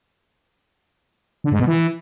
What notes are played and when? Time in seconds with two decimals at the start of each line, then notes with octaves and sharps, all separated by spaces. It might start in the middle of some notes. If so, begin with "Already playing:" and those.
1.44 D3
1.52 G#2
1.59 B2
1.67 E3